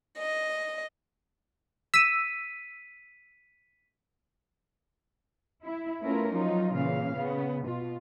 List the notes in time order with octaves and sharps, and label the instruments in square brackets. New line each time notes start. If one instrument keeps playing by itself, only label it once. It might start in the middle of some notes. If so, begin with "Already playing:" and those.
[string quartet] D#5
[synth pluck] E6 [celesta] B6 D#7
[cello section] E4
A3 B3 C#4 E4 F4 A#4
F3 F#3 D#4 F4
A#2 C#3 E3 F5
C#3 B3
B2 F4